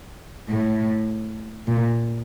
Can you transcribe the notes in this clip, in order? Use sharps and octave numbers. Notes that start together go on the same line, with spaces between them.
A2
A#2